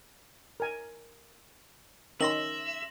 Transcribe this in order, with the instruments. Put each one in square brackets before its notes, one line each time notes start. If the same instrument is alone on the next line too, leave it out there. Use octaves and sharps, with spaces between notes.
[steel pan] A#4 G#5
[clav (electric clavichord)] D#3 [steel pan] C#4 [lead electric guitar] E5 [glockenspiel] C6 A#6 F#7